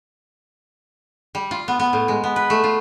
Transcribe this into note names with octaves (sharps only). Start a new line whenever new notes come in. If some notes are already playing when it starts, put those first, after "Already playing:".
G3
F4
B3
B3
A2
G#3
B3
B4
A3
F4